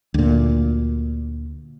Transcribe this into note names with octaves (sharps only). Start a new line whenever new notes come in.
D2 A#2